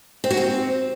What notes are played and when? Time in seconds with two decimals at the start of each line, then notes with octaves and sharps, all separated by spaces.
0.24 C4
0.31 F#4
0.37 C4